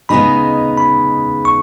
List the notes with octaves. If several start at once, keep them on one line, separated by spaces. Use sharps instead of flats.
C#3 G#3 B3 D#4 G#4 B5
B5
C#6